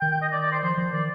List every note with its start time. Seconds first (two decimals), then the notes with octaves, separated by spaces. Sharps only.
0.01 D#3 G5
0.11 G5
0.22 D#5
0.32 D5
0.42 D5
0.52 C5
0.62 F3 C5
0.78 F3
0.93 D#3 D5